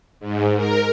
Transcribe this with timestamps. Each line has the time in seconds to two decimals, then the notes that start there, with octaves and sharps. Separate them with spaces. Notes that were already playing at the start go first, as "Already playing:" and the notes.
0.20 G#2
0.56 A#4